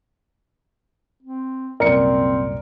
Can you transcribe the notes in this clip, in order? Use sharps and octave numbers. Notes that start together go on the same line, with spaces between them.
C4
C2 F#2 A#2 C4 A#4 D5 C#7